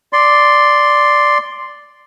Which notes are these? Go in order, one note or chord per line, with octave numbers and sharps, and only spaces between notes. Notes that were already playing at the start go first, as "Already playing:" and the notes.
D5 C6